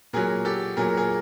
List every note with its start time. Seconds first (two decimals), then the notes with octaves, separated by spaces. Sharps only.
0.13 A#2 F#3 G#4 A#4
0.45 G4 A4
0.77 A#2 F#3 G#4 A#4
0.97 G#4 A#4